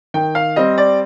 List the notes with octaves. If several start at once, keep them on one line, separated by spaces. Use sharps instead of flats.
D#3 G5
F5
G3 C4 D#5
D5